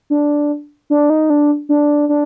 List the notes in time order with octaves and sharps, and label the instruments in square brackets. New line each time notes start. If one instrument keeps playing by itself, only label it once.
[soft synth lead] D4
D4
D#4
D4
D4
D4